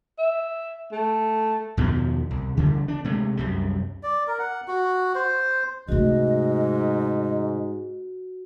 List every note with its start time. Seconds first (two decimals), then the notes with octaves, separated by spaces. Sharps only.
0.18 E5
0.92 A3
1.77 E2 B2 D#3 F3
2.31 C2
2.57 C#3 E3 F3 G3
2.88 D4
3.04 C3 G#3 A3
3.37 C2 F#2 G3
4.03 D5
4.27 A#4
4.39 F#5
4.68 F#4
5.15 C5
5.88 G#2 C3 A3 F#4 D#5